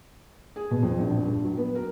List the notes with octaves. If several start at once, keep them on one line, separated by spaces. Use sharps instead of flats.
G#4
B2
F2
A#1
A#1
G2
F#3
B3
A#4